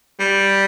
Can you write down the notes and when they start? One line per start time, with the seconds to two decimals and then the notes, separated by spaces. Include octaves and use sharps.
0.20 G3